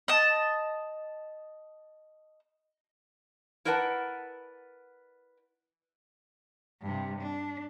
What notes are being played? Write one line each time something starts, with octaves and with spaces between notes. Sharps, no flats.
D#5 A5
E4 A#4 B4 D5 F#5 A5
G2 C3
D4